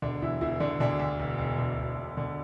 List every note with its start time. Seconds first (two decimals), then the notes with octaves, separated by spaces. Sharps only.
0.02 E1 D3 D4
0.21 E1 E3 E4
0.41 E1 E3 E4
0.60 D3 D4
0.80 D2 D3 D4
1.00 D2
1.19 E1
1.39 E1
1.58 D2
1.78 E1
1.97 E1
2.17 D3